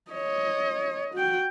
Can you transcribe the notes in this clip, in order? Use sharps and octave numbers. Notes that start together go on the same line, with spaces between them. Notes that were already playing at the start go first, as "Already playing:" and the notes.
C#5 D#5
F#4 G5